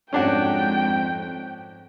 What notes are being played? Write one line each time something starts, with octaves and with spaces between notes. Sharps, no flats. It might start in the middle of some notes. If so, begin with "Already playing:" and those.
F2 G#2 C#4 D4 F#4 G5